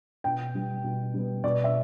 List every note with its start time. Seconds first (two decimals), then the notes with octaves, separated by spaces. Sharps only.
0.24 B2 G5
0.55 G3 B3
0.84 B2
1.14 G3 B3
1.44 B2 D5
1.64 E5